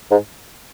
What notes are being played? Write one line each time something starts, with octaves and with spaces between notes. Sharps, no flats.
G#2